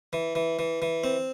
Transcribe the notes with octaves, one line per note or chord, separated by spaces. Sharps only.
E3
E3
E3
E3
C4